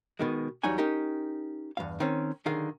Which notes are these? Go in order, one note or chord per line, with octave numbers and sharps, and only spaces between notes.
B2 D#3 G#3
E2 F#3 G3 D#4 F#4 G#5
C#4 D#4 G4 A#4
E2 G2 F5
D#3 C4 C#4
B1 D3 D#3 G#4 F5